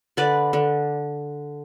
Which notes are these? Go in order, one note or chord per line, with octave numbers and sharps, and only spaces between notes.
D3 B4 D5
D3